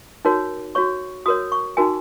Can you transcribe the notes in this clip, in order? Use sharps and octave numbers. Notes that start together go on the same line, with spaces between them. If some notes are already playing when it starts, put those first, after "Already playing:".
D#4 F#4 A#4 C#5
F#4 C#5 C#6
F#4 A#4 C#5 D#6
C#6
D#4 F#4 A#4 G#5